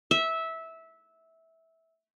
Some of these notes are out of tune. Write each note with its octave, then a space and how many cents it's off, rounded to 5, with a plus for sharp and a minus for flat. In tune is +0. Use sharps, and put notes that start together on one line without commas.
E5 -15